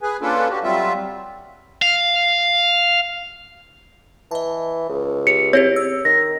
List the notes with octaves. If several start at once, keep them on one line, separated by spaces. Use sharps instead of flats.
G#4 B4 G#5
A#3 C#4 D4 F4 A4 B4
F#4 G4
F#3 G3 C4 F4 E5
F5
E3 D#5 A5
C#2
G4 C#5 C#7
C4 E4 G4 C#5
E6
D#3 A#6